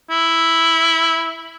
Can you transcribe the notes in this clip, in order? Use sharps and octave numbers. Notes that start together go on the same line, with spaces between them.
E4